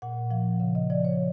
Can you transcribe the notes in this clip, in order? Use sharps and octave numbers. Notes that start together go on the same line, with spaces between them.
A#2 F#5
F3 F5
C#3 F5
D#5
F3 D5
C#5